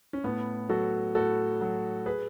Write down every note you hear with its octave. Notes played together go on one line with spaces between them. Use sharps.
C#4
A2 B3
F#3 F#4 A4
A2 F#4 A4
F#3
G#4 B4